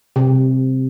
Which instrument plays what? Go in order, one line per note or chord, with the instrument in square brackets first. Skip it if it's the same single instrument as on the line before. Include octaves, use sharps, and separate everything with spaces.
[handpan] C3